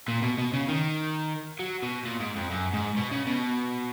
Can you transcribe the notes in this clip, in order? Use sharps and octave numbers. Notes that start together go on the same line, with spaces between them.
A#2
B2
B2
C#3
D#3
F#3
B2
A#2
G#2
F2
F#2
G#2
B2
C#3
B2